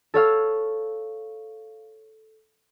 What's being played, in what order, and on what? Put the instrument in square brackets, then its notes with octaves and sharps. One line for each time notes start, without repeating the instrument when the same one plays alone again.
[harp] A4 C#5 F5 E6